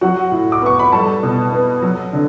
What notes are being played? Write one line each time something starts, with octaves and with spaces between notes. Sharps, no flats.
F#3 F#4 F#5
A2
D6
B3 C#6
B5
G3 A4 A5
B2
B3
F#3
D3